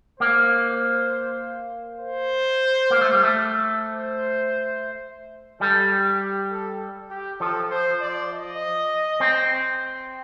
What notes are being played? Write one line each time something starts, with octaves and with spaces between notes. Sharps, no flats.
A#3 C5
C5
A#3
A3
G3
A3
C5
G3 A4
G4
G4
A4
G4
F3 A4
C5
D5
D#5
C4